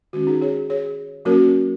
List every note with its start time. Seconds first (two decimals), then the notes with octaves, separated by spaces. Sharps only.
0.13 D#3 G#3 C#4 F#4
0.27 D#4 G#4
0.41 G#4 C#5
0.70 G#4 C#5
1.25 F#3 A#3 C#4 F#4 A#4